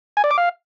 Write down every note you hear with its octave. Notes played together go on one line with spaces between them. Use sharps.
G#5
D5
D6
F5